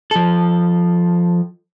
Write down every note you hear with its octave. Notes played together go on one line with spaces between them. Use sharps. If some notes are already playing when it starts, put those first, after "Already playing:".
F3 A4